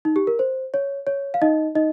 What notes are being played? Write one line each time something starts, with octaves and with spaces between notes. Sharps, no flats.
D#4
G4
A#4
C5
C#5
C#5
F5
D#4 D#5
D#4 D#5